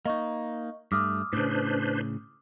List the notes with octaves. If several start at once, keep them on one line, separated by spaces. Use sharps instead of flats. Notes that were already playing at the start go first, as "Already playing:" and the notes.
A#3 D#4 D#5 C#6
G2 A3 D6 D#6 F6
A2 C#3 D4 B4 C5